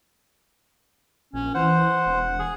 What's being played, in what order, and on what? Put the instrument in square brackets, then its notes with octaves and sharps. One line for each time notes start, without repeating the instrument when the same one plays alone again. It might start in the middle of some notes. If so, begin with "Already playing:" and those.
[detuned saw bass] A#1 [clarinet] C#4
[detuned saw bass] E3 [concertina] C5 [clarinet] F#5
[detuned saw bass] E1
[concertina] G#4